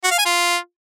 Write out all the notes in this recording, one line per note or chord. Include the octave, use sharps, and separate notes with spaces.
F#4
F5
G#5
F4